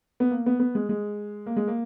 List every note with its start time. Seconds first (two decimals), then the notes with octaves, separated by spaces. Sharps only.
0.20 B3
0.31 A#3
0.46 B3
0.60 B3
0.75 G#3
0.89 G#3
1.46 A#3
1.56 G#3
1.68 A#3